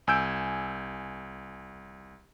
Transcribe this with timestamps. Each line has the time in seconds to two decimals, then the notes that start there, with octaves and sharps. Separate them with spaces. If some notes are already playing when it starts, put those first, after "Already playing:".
0.07 C2 G#5 E6 G6 D7